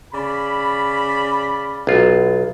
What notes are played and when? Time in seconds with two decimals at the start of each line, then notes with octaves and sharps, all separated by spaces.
0.13 C#3 D5 B5
1.87 B1 F4